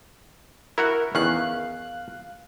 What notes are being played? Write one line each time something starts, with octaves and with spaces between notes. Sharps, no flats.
E4 F#4 A#4 F#5
E2 D#3 C#4 F5 F#6